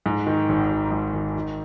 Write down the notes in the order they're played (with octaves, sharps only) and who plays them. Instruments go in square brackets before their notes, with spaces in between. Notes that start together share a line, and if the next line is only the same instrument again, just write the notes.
[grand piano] G#2
D#3
G#1
G#1
G#2
D#3
D#3